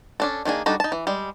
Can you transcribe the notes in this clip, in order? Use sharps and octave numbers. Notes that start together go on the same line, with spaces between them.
C#4 D4 A4
D#3 A#3 D4 G#4
G3 D4 D#4 F#4 A4
D#4 A5
E3
G3 G#3